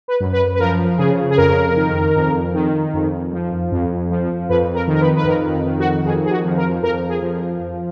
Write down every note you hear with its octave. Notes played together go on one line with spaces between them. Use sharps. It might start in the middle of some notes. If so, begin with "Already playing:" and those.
B4
F#2
B4
B4
F3 A#4
C#3 G#4
G#4
F2 A#4
D#3
F2
D#3
F2
F3
F2
F3
F2 B4
A#4
D#3
A#4
B4
B4
F2 A#4
D#3
F#4
F2 G#4
G#4
F#4
F3
A#4
F2 A#4
G#4
F3